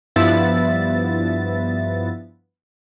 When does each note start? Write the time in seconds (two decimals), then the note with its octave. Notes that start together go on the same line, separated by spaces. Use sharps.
0.16 G2 F3 B3 E4 E5 A6